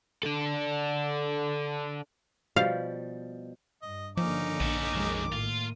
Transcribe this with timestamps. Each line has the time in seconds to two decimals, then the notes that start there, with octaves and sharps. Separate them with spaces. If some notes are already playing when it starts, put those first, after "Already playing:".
0.23 D4 A4
2.56 B2 F3 G3 F5
3.82 G2 D#5
4.17 G1 D3 F3 A#3 C#4 D#4 D6
4.60 A#1 B3 A4
4.94 F2 C3 D#3 F#3 G#3
5.32 A2 A#3 F4